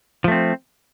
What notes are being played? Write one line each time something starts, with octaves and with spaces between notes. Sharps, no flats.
F3 A3 C4